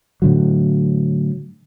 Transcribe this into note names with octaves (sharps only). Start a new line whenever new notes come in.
A2 D3 F#3